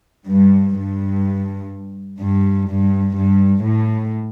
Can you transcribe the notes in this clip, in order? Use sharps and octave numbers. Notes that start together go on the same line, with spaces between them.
G2
G2
G2
G2
G2
A2